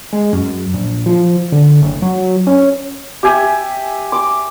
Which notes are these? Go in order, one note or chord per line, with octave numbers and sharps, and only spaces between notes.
G#3
F#2
A#1
F3
D3
F#1
F#3
C#4
G4 E5 G#5
D6